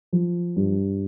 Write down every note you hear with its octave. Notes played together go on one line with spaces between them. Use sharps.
F3
G2